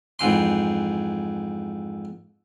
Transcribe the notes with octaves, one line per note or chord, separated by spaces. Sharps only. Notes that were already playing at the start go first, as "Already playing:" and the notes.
F2 G#2 E3 C6